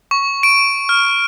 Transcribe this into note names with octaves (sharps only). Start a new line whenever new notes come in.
C#6
D7
F6